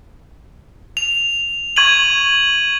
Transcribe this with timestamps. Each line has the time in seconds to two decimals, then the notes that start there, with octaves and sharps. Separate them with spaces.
0.97 F7
1.76 C#6 G#6 D#7 F#7